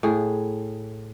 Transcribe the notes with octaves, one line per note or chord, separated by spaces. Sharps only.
A2 G#4